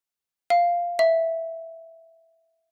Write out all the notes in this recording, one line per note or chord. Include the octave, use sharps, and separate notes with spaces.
F5
E5